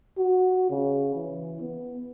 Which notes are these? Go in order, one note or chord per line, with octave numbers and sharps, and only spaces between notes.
F#4
C#3
E3
B3